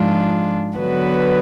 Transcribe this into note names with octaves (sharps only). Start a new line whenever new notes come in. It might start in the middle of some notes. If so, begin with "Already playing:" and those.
Already playing: G#2 F3 G#3 D4 F4
D3 F#3 B3 F#4 B4